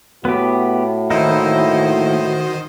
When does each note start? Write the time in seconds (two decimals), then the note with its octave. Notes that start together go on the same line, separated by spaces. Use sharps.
0.25 A2 B3 F#4 G4
1.10 D#3 A#3 D#4 E4 C5 D#5